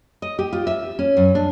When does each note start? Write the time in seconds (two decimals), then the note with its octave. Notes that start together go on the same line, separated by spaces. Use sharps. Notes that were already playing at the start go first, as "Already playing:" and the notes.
0.22 D#5
0.39 G4
0.53 F4
0.67 E5
0.99 C#4
1.17 F#2
1.35 D4